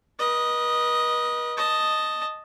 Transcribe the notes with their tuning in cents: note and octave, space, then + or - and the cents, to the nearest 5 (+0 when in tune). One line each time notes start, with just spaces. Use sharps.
B4 -40 D#5 +0
D#5 +0 A5 +0